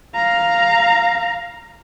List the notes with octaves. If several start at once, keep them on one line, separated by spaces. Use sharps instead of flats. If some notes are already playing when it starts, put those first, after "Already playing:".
F5 A#5